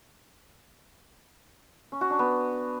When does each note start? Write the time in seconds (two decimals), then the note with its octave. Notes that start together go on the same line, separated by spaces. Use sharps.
1.92 C#4
2.01 F#4
2.10 D4
2.19 B3